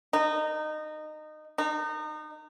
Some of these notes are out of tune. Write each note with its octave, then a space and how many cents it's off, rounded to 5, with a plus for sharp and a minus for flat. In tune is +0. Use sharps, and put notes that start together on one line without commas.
D#4 -20
D#4 -30